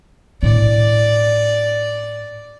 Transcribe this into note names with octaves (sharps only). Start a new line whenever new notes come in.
A2 D4 D5